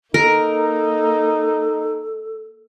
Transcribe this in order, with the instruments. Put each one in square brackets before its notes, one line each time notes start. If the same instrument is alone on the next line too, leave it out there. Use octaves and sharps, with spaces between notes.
[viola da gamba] A#3 [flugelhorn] D#4 [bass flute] A4 [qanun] A#4